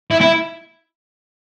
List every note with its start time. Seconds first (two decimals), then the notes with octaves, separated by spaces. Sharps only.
0.11 E4
0.21 E4